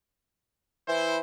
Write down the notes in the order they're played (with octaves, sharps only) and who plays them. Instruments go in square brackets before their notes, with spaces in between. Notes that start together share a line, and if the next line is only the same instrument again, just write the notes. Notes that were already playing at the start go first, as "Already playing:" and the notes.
[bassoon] E3 [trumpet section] E4 C5